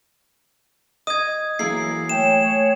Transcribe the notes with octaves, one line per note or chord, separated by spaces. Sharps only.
D#5 D#6 G#6
E3 F#3 A#3 E4 G#4 A#4 C7
A3 C#5 G5 G#5 E7